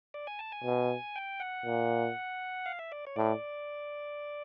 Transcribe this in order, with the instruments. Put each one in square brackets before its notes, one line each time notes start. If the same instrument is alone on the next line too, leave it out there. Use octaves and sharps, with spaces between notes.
[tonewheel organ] D5
G#5
A5
G#5
[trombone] B2
[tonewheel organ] G5
F#5
[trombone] A#2
[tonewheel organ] F5
E5
D5
C#5
[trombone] A2 [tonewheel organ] D5